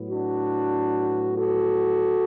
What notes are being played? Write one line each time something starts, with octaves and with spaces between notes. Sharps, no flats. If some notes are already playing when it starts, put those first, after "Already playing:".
Already playing: A2 F#3 B3
D4 F#4
F#4 A4